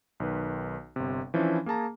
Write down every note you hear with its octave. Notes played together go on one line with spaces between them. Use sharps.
B1 D#3 B4
G1 C3
E3 F3 C#4 D4 E4
A#3 G#4 A5 A#5